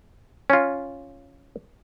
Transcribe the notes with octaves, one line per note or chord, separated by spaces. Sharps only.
C#4 F4